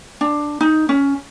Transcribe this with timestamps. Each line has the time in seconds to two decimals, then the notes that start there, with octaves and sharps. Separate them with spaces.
0.21 D4
0.61 D#4
0.89 C#4